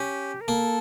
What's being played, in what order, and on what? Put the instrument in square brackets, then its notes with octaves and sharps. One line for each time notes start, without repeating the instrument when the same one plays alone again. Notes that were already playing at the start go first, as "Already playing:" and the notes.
Already playing: [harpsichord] C#4 [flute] G4
[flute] A#4
[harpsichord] A#3 [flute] A4